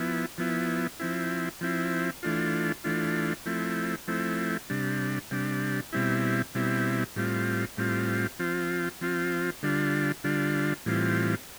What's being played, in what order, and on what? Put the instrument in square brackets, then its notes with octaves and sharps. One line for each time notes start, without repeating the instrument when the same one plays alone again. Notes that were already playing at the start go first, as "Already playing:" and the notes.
Already playing: [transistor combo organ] F3 B3 E4
F3 B3 E4
F3 C4 E4
F3 C4 E4
E3 A3 D4 F4
E3 A3 D4 F4
F3 A3 C4 E4
F3 A3 C4 E4
C3 G3 D4
C3 G3 D4
B2 G3 C4 E4
B2 G3 C4 E4
A2 G3 C4 F4
A2 G3 C4 F4
F3 C4 F4
F3 C4 F4
D3 G3 D4 F4
D3 G3 D4 F4
A2 E3 G3 C4 F4